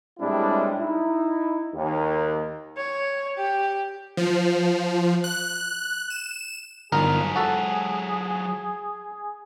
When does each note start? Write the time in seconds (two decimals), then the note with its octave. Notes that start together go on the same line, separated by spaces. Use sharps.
0.20 A2 G3 G#3 C4 D4 E4
0.79 D#4 E4
1.75 D#2
2.77 C#5
3.37 G4
4.17 F3
5.24 F#6
6.10 E7
6.92 G1 F#3 D#4 F4 G#4 A#4
7.36 F#4 A4